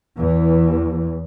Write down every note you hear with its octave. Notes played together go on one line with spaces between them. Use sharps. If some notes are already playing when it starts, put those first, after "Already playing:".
E2 E3